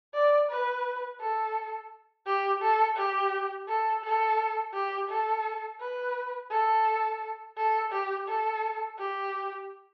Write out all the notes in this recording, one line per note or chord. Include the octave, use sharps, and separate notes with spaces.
D5
B4
A4
G4
A4
G4
A4
A4
G4
A4
B4
A4
A4
G4
A4
G4